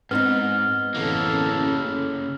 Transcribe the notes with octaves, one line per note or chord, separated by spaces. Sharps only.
G#2 B3 C4 D#4 F6
A1 C#3 A#3 A4